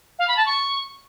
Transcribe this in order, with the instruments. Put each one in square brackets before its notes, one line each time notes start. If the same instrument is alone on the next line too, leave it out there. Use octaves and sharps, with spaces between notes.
[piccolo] F5
B5
A5
C#6